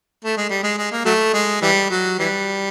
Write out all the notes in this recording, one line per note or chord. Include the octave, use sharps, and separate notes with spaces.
A3
G#3
G3
G#3
G#3
A#3
F#3 A3
G#3
E3 G3
F#3
E3 G3